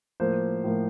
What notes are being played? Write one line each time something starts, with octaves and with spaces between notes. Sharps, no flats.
A2 F3 A#3 C5
A2 F3 A#3